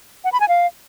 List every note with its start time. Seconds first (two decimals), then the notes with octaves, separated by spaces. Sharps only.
0.24 F#5
0.32 B5
0.40 G#5
0.48 F5